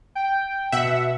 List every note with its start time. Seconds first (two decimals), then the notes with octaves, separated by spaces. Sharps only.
0.15 G5
0.72 B2 E5 F#5